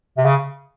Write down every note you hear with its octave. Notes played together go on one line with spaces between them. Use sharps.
C3
C#3